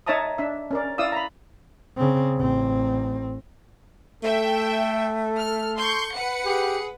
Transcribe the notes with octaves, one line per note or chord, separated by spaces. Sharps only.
D#4 C#5 E5 A5 A#5 D#6
D4 E5
C#4 A#4 D5
E4 D5 F5 D#6 E6
A#5 B5
C#3 C4
A1 C4
A3 A4 E5 G5
F6
C6 C#6 G6
B4 F#5 C#7
G4 G#4